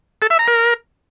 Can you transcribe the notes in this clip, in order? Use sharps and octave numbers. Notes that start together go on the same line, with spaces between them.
A4
E5
A#5
A#4